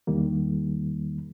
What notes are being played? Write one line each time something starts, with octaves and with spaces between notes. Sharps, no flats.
E2 D#3 G3 A#3